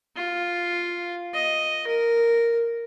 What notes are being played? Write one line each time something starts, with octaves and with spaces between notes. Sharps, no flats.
F4
D#5
A#4